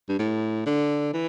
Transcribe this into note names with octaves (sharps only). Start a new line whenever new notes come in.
G2
A2
D3
E3